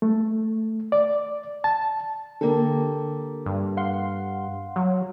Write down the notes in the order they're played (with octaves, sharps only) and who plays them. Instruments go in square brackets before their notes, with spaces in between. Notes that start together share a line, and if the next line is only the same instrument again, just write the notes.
[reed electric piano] A3
D5
A5
[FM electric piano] D3 [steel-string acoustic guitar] A#3 G4 A4
[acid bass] G2
[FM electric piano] F5 F#5 C6
[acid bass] F#3